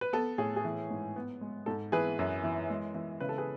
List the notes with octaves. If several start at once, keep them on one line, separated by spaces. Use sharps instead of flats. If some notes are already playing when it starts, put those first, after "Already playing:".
B4
B3 A4
A2 G#4
G#4
E3
G#2
B3
G#3
G#2 A4
E3 G#4 B4
F#2
E3
G#3
E3
C#3 B4
A4
G#4 B4